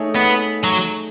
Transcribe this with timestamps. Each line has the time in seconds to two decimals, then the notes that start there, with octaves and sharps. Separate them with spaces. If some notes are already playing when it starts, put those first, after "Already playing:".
Already playing: A3 D#4 G#4 C#5
0.16 B3
0.64 F#3